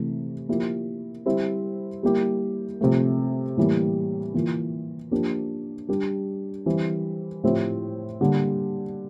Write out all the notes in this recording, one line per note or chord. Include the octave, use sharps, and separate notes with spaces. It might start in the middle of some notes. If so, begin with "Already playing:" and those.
Already playing: C3 E3 A3
F3 A#3 E4 G4
G3 C4 E4 G4
G3 A#3 E4 G4
C3 F3 A3
A2 E3 G3 A#3
E3 A#3 F4
F3 A#3 D4 G4
G3 D4 G4
E3 G3 C4
A2 F3 C4 E4 G4
D3 G3 A#3